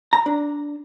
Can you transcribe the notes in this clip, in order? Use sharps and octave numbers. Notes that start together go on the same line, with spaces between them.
A#5
D4